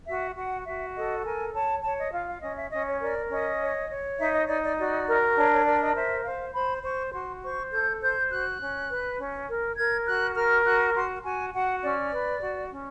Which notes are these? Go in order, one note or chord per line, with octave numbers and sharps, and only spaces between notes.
F#4 E5
F#4 F#5
F#4 E5
A4 D#5
A#4 G#5
C#5 A5
C#5 A5
D#5
F4 F5
F5
C#4 D#5
E5
C#4 D#5
C#5
A#4 D5
C#4 D#5
C#5
C#5
D#4 E5
D#5
D#4 D5
D5
F#4 D5
A#4
D4 C#5
C#5
A#4 D5
D#5
C5 E5
C5 F5
C5 B5
C5 C#6
F#4 C6
C5 C#6
A4 G6
C5 G6
F#4 F#6
C#4
B4
C#4
A#4
A#4 G#6
F#4 F#6
A#4 F6
F#4 F#6
F#4 C6
F#4 G#5
F#4 F#5
C#4 D5
B4
F#4
C#4